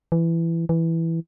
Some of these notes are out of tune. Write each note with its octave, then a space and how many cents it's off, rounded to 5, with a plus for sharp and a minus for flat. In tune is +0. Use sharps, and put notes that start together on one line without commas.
E3 +15
E3 +0